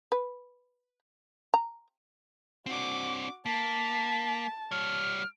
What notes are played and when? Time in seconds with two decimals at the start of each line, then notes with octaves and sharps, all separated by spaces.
0.12 B4
1.54 A#5
2.66 C4 D4 F#4 D6
3.46 A#3 A5 B6
4.71 G3 C#5 F6